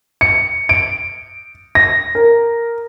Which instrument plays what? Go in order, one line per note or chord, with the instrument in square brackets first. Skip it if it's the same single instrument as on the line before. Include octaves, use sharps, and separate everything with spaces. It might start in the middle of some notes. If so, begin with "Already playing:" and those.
[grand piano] C#7
D7
A#6
A#4